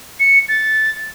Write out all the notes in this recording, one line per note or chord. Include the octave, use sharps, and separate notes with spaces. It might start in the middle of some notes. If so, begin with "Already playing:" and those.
C#7
A6